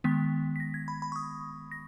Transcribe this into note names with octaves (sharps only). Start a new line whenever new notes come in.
D#3 G#3 B3 B6
B6
A#6
G#6
B5
B5
C#6
D#6
A#6